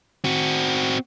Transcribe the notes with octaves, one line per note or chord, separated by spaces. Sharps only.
C4 F#4